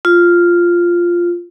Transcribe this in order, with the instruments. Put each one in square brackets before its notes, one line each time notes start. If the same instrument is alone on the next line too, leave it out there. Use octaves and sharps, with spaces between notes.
[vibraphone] F4